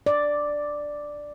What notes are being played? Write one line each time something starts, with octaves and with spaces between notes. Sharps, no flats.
D5